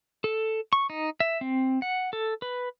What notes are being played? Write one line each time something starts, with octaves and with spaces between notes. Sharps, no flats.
A4
C#6
D#4
E5
C4
F#5
A4
B4